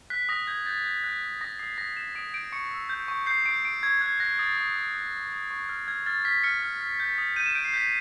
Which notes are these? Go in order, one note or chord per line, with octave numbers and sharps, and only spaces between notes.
F#6 B6
D#6 A#6
G6 G#6
G6 A6
G6
F#6
F#6
D#6 A#6
D#6 C7
D#6 A#6
G6 E7
D#6 D7
G6 D7
C#6 C#7
E6
G6
C#6
G6 C7
C#6 D7
C#6 D7
C#6 G#6
F#6 G#6
F#6 A#6
D#6 A6
D#6
D#6
D#6
D#6
D#6
C#6
F6
F6 G#6
F6 A6
F6 B6
F6 C#7
F6
F6
G6
D#6
G6 D#7
E7
G6 D7
C7
G6 B6